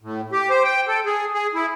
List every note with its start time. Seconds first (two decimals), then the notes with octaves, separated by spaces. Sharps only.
0.02 A2
0.32 G4
0.50 C5
0.64 G5
0.88 A4
1.06 G#4
1.34 G#4
1.55 E4